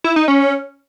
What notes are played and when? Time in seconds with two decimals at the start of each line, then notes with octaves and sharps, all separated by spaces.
0.04 E4
0.16 D#4
0.28 C#4